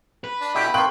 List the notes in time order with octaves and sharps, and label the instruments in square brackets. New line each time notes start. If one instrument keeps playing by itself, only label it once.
[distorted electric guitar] B4
[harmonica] D4
[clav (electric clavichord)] B2 D3 G4 [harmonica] E4 G5
[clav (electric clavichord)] D#3 A#3 [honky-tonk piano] G5 F#6 F#7 [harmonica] C6 C#6